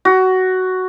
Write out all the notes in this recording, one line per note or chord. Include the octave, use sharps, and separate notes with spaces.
F#4